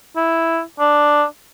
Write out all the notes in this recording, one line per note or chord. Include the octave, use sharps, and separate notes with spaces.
E4
D4